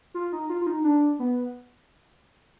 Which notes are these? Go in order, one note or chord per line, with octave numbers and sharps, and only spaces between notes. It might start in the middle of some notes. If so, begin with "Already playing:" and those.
F4
D#4
F4
F4
D#4
D4
B3